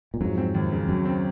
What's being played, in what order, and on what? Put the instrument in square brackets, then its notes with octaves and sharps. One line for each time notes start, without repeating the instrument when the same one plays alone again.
[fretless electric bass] A#2
[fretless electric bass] F2 G#2 [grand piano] F#3
[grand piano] C4
D#2
C#3
[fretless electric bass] F#2 [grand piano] F#3
[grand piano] C4